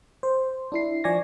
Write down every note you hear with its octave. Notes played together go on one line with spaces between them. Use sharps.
C5
D4 E4 C7
F3 D5 G#5 C#6 A#6